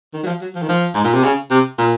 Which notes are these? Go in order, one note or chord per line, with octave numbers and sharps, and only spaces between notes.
D#3
F#3
F3
F#3
F3
D#3
F3
G#2
A#2
C3
C#3
C3
A#2